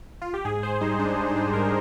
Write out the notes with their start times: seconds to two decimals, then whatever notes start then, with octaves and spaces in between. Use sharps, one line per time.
0.22 F4
0.34 G4
0.45 G#2 G#4
0.63 G#2 C5
0.81 G3 D#4
0.99 G3 D4
1.17 G#2
1.26 D#4
1.36 G3
1.53 G#2 A#4